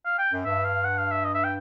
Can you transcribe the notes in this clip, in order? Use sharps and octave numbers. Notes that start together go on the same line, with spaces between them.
F5
G5
F#2
G2 E5
F5
F#5
F5
E5
D#5
E5
G5